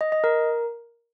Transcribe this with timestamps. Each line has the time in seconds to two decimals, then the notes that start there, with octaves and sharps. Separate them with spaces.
0.01 D#5
0.12 D#5
0.24 A#4